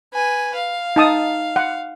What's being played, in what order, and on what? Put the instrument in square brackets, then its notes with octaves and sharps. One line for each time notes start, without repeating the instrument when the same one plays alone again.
[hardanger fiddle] B4 G#5
F5
[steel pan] D#4 A5 D#6
F#5